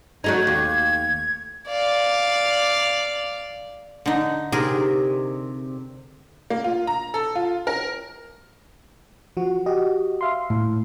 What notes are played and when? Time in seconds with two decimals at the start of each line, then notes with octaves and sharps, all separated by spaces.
0.24 F#3 A3 D#4 G#6
0.47 D#2
1.68 D5 F5
4.06 D3 D#4
4.52 C3 D4 D#4 G#4 A#4
6.50 A#3
6.64 F4
6.87 A#5
7.14 A4
7.35 F4
7.67 A#4
9.37 F3 F#4
9.66 F#4 G4 D#5
10.21 E5 F5 C6
10.50 A2